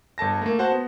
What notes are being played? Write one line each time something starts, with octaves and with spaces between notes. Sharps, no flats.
G1 A4 A5 A#6
A3 A#3
F#4 C5 F#5 A5
B3